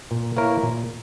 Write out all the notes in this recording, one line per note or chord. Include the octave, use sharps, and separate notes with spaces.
A#2
A#3 E4 A#4 C#5
A#2